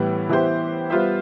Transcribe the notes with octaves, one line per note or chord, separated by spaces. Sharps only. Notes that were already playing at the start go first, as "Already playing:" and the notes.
Already playing: A2 E3 G3 B3
E3 B3 E4 G4 C5
G3 B3 F4 C5 E5